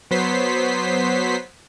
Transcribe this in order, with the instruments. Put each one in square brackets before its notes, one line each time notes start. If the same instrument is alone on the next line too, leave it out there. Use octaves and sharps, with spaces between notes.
[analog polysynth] F#3 B3 C5 B6 C7